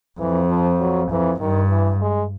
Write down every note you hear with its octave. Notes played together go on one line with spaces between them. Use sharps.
F2 E3
F3
F#3
F2 E3
G2 D#3
E3
G#3